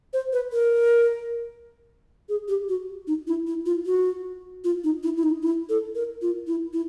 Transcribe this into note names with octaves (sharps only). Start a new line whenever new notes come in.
C5
B4
A#4
G#4
G4
F#4
D#4
E4
E4
F4
F#4
F4
D#4
E4
E4
D#4
E4
A4
A#4
F4
E4
E4